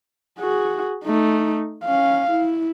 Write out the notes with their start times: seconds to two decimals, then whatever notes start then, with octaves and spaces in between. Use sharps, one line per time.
0.39 F#4 G#4
1.05 A3 D#4
1.85 C#4 F5
2.31 E4